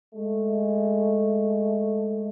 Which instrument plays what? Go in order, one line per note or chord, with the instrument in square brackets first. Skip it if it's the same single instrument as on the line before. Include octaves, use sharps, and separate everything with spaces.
[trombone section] G#3 A3